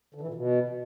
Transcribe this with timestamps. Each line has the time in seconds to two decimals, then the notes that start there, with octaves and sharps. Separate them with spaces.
0.14 D3
0.21 E3
0.27 A#2
0.34 B2